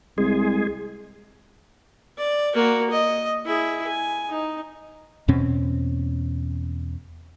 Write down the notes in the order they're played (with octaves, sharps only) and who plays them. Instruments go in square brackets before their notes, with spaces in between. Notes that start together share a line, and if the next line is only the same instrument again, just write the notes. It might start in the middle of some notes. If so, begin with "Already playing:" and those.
[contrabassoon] C2 [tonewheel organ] G#3 G#4
[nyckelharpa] D5
A#3 F#4
D#5
E4 G#4
G#5
D#4
[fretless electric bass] E2 B2 C4 C#4